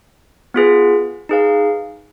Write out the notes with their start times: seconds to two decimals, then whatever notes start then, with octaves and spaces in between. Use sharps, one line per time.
0.54 B3 F4 G#4 B4
1.29 D#4 G#4 B4 F5